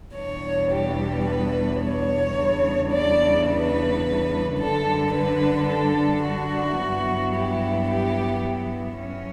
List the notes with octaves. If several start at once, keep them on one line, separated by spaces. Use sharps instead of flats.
E2 B2 G3 D4 C#5
G4
B4
C#5
E2 C#3 G3 D4
D5
B4
F#2 D3 G3 D4 A4
B4
A4
F#4
G2 F#3 B3 E4
G4
G4
F#3 C#4